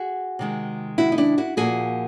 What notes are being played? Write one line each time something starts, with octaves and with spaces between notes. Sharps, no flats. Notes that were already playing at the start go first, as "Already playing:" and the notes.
Already playing: F#4 G#4
C3 D#3 G#3
E4 F#4
D#4
D4 E4
E4 F#4
A#2 F3 A#3 F#4 G#4